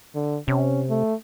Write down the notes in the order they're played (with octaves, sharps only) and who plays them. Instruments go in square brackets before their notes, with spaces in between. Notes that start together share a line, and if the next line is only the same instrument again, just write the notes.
[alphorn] D3
[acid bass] C3 [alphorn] C#4
[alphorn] A3